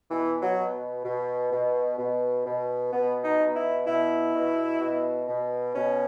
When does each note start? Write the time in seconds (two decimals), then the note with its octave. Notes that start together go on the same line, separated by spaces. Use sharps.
0.11 B2 E3
0.42 F#3
0.57 B2
1.05 B2
1.52 B2
1.98 B2
2.46 B2
2.93 B2 B3
3.24 D#4
3.40 B2
3.56 E4
3.87 B2 E4
4.34 B2
4.81 B2
5.28 B2
5.75 B2 C#4